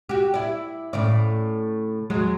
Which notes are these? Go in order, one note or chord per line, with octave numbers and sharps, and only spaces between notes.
F#4 G4
E4 D5
A2 C#3 D5
E2 F#3 G#3